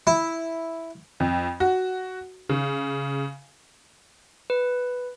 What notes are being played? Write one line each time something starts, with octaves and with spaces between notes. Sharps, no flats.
E4
F2
F#4
C#3
B4